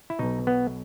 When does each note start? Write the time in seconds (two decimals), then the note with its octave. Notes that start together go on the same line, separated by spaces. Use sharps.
0.10 E4
0.19 B1 B2 D#4
0.47 B3